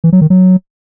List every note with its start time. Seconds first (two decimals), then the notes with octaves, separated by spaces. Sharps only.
0.04 E3
0.13 F#3
0.21 D#3
0.30 F#3